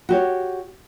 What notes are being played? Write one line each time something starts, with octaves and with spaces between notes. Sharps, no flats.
F#4 G4 C#5